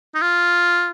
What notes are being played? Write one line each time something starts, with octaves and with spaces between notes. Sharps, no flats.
D#4
F4